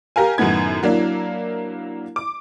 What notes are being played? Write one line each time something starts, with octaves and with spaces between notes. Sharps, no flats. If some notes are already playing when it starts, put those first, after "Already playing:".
G4 A#4 F5 G#5
F#2 A2 D#3 B3 G#6
F#3 A#3 D4 E4
D6